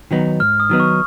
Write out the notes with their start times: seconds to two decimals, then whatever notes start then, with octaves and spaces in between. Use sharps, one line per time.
0.11 D#3 F#3 B3 D#4
0.40 G#2 F6
0.60 D#6
0.69 D#3 F#3 B3 D#4
0.80 C#6